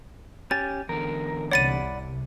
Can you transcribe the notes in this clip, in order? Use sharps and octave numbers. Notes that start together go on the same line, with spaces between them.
C#4 G4 G#5 A6
E2 D3 A#4
C2 C3 C#5 D5 F#5 B5 A6 D#7